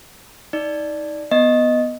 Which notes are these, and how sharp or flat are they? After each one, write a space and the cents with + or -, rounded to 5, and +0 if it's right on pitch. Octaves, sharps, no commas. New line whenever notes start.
D#4 +25 D5 +0
B3 +0 D#5 +0